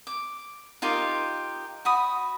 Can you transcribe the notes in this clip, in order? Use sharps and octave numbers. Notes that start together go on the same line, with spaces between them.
D6
D#4 F4 G4 A#4
F#4 B5 D#6